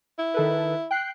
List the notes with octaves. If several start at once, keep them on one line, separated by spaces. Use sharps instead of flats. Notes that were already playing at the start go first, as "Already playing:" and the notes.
E4
D#3 A4 B4
G5 F#6 C7